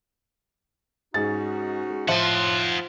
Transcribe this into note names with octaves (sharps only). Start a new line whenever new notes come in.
G#2 C#4 D#4 F#4 G#4 A6
G#3
A2 F3 C5 E5 F#5